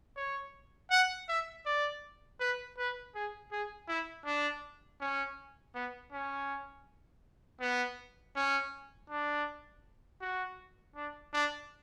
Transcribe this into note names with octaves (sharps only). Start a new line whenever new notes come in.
C#5
F#5
E5
D5
B4
B4
G#4
G#4
E4
D4
C#4
B3
C#4
B3
C#4
D4
F#4
D4
D4